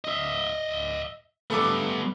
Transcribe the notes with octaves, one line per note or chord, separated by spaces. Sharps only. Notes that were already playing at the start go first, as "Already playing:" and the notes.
D#5 E5
G3 A3 B3 A4 D6